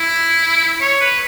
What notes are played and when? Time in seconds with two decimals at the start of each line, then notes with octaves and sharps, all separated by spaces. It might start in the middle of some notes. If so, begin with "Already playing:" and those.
Already playing: E4
0.81 C#5
1.01 B4